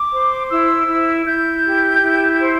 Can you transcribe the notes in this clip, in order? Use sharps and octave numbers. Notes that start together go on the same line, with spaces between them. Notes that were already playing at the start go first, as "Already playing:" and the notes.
Already playing: D6
C5
E4 E6
E4
E4 G6
G4
E4
C5